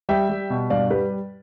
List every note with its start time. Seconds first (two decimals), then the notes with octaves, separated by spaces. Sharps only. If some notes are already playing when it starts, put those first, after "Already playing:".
0.09 G3 E5 G5
0.29 G3
0.50 B2
0.70 G2 D5 F5
0.90 G3 G4 B4